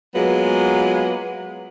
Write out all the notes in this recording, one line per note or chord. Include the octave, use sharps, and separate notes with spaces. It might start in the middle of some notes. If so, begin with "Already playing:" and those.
F#3 G#3 A#3 B3 F4